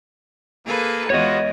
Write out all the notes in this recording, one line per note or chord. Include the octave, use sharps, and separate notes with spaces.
A#3 G#4 A4 B4
E2 G#3 B3 F4 F#4 C#5 D#5